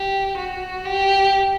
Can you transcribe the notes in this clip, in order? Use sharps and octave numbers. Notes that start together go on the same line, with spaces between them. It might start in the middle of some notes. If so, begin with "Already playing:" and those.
Already playing: G4
F#4
G4